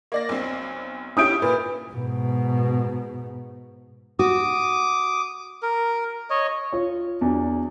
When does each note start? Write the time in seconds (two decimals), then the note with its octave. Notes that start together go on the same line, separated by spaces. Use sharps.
0.12 A#3 D5 A#6
0.29 B1 C4
1.17 C#4 E4 G4 D#6 G6 D7
1.42 A#2 B4
1.92 G#2 B2
4.19 F#4 D6 D#6
5.63 A#4
6.30 C#5 D#5
6.73 F4 C#5
7.21 E2 F#3 D4